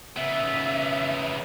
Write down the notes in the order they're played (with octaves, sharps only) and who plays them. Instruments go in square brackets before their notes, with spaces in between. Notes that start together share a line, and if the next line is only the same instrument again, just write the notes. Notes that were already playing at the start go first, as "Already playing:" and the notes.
[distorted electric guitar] C#3 B3 [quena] E5